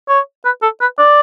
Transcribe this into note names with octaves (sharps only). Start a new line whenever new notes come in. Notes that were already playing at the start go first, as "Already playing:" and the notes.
C#5
B4
A4
B4
D5